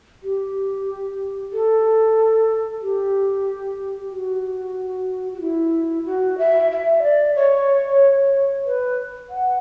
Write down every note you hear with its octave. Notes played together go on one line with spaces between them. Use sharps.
G4
A4
G4
F#4
F#4
E4
F#4
E5
E5
D5
C#5
B4
F#5